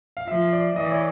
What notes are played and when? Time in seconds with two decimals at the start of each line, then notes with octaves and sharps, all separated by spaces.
0.17 F5
0.28 F3 E5
0.53 D5
0.76 E3 D#5
0.84 D5
0.91 C#5